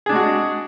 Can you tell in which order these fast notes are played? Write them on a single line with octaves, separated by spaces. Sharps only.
G#4 D4 G#3 F#4